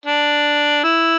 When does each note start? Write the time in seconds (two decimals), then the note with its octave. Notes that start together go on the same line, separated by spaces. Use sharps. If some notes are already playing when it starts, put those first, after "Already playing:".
0.06 D4
0.84 E4